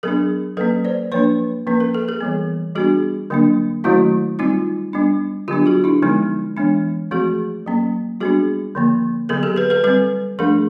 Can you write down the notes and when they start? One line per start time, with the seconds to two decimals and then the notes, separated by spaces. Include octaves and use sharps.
0.03 F#3 B3 D4 G#4 A#4
0.57 F#3 A#3 C#4 A4 B4
0.85 C5 D5
1.12 F3 A#3 D4 B4 C#5
1.67 F3 A#3 C#4 B4
1.80 A#4
1.94 A4
2.08 G#4 A#4
2.21 E3 G3 B3
2.75 G3 B3 D4 F#4 G#4
3.30 D3 F#3 A#3 D4
3.84 D#3 F#3 A3 C#4 E4 F#4
4.39 G3 C4 D#4 F4
4.93 G3 B3 D4
5.48 D3 F#3 B3 D4 F4 G4
5.66 F#4 G#4
5.84 D4 E4
6.02 D3 F3 G#3 B3 D#4
6.57 E3 G#3 B3 D4
7.11 F3 A3 C4 F#4 G#4
7.66 F#3 A#3 C#4
8.20 G3 B3 D4 F#4 G#4
8.75 D3 F3 A#3
9.29 D3 F#3 B3 G#4 A#4
9.43 G4 A4
9.56 A4 B4
9.70 A4 B4
9.84 G3 C4 A4 B4
10.39 F3 A3 D4 G#4 A#4